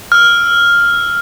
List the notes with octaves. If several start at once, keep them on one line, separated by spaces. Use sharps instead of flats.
E6 F6